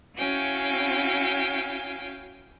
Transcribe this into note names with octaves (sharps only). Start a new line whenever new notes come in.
C#4 E4 F#4 F5 G5 G#5